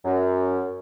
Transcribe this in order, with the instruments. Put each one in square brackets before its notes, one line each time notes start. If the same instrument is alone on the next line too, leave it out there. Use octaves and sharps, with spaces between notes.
[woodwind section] F#2